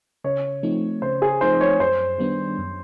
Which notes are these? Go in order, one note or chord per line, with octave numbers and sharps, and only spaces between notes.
C#3 C#5
F3 A3 C4 D#4
C#3 C5
G#4
F3 A3 C4 D#4 C5
C#5
F#2 C5
D#3 G3 B3 D4
F#2